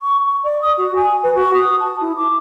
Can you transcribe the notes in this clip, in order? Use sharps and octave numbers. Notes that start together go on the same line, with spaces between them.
C#6
C#6
D5
D#6
F#4
G#5
B4
F#4
D#6
A5
E4
D6